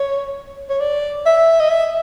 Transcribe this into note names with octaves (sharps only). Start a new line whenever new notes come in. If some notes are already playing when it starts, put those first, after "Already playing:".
Already playing: C#5
C#5
D5
E5
D#5
E5